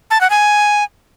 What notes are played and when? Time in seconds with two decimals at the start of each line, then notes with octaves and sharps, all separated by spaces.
0.11 A5
0.21 F#5
0.30 G#5